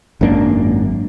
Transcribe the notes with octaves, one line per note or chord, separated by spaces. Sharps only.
G#1 F#2 A#3 D4